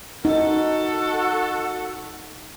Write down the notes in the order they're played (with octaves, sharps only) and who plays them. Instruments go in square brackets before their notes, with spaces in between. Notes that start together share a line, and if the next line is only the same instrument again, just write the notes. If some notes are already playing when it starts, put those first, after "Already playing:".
[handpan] D#4 [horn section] F#4 A4